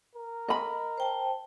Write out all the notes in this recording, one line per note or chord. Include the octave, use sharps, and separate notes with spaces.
A#4
D#5 B5
C5 G5 A5